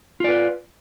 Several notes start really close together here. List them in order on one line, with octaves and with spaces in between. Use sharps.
F4 D5 B4